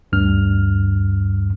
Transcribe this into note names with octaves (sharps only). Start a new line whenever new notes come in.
D2 G2 F6